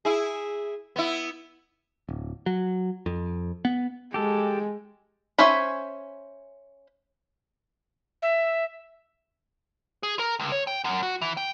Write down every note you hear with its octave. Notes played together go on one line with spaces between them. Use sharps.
E4 G#4
B3 E4
D1
F#3
F2
B3
G#3 G4 A4
C#4 C5 E5 G#5 B5
E5
G#4
A#4
C#2
C#5
G5
F#2
F#4
E3
G5